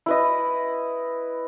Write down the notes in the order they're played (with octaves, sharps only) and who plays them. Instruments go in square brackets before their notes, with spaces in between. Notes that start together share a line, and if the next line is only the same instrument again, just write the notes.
[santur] E4 B4 D#5